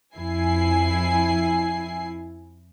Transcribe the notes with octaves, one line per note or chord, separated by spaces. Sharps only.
F2 E4 G#5 C7